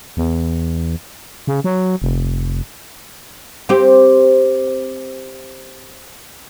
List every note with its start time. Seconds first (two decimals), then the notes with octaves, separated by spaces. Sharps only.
0.17 E2
1.47 C#3
1.64 F#3
2.02 F1
3.69 C4 G4